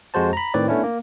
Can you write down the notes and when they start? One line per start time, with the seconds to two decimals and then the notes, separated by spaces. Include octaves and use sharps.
0.14 F2 G#3 F#4 C5 A5
0.33 A#5 B5
0.54 A2 D#3 C4 B4 C#5 D5
0.68 A3 B3 C#4 D4 E4
0.83 A#3